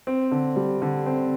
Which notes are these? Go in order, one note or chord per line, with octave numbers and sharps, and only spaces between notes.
C4
D3
G3
D3
C4